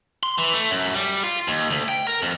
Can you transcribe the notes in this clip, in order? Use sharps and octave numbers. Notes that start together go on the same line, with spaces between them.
C6
E3
A3
F#2
G3
F4
D#2
D2
G5
A#4
F2